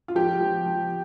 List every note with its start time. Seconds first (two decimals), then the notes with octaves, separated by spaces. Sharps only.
0.08 F4
0.15 F3 G4
0.40 F3
0.66 F3